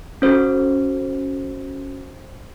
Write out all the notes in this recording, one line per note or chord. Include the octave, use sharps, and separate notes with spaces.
C#4 F#4 A4 C5